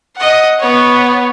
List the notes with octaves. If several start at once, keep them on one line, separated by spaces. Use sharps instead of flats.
D#5 F#5
B3 C#5